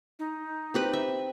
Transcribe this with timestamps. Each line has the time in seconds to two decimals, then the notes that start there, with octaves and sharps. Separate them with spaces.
0.19 D#4
0.74 C4 G4 B4
0.93 E5